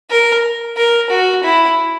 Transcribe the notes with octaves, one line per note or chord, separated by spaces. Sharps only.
A#4
A#4
F#4
E4